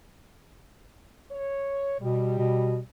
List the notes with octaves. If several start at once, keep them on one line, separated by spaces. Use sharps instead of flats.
C#5
B2 G3
B2